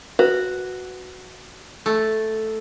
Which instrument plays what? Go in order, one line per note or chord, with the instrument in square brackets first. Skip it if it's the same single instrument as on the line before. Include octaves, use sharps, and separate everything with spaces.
[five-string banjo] F#4 [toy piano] B4
[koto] A3